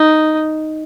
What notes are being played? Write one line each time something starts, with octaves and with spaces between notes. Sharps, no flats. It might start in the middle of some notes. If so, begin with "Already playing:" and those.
Already playing: D#4